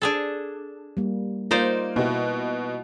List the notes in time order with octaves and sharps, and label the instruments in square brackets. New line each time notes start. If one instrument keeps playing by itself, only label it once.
[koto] D4 G#4 A4
[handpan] G3 A#3
[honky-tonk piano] A#3 [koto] D#4 C5 D5 [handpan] F4
[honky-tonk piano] B2 F#4 [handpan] A#3 E4